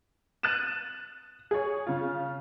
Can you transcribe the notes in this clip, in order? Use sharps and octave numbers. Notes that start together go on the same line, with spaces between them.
F#6 A6 D#7 E7
G#4 C#5
C#3 F4